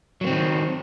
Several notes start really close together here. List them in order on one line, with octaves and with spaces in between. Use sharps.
F#3 A#3 C4 D#3